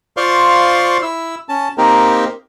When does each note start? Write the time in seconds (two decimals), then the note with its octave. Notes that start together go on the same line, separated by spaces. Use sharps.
0.17 F4 C5 D5 F5 C6 C#6
1.02 E4 E6
1.49 C#4 A5
1.78 A#3 C4 D#4 G4 A#4